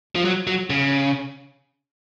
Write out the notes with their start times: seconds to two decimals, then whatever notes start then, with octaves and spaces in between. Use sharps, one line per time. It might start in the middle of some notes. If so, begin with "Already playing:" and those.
0.15 F3
0.25 F#3
0.47 F#3
0.70 C#3